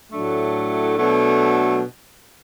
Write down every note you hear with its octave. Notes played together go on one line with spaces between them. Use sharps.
A2 F#3 A3 D4 A4
B2 F#3 A3 D4 A4